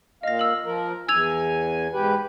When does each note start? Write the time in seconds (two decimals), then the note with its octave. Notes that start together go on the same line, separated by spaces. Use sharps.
0.23 A#2 D#5 F5 A#6
0.39 E6 F#7
0.65 F3 A#4
1.09 E2 G#5 E6 G#6 F7
1.93 G#2 G4 B4